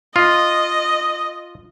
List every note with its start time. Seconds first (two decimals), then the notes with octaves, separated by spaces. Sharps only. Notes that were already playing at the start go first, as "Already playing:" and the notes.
0.16 F4 D#5